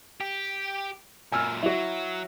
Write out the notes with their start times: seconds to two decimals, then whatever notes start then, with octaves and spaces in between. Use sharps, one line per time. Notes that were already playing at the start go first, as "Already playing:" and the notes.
0.20 G4
1.32 F#2 A#2 G#5 E6 F6
1.62 F#3 E4 F#4